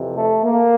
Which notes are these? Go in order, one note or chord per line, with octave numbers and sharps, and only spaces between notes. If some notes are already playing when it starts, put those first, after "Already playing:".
Already playing: F2 C3 E3
A3
A#3